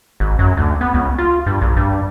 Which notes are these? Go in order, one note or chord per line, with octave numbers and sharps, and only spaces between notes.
G#1
F#2
D2
B3
C#2
F4
G2
A#1
G2